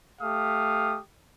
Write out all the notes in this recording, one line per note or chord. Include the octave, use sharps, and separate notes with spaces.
A3 G4 F5 D#6